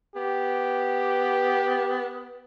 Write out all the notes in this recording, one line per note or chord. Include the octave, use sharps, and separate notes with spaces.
B3 G4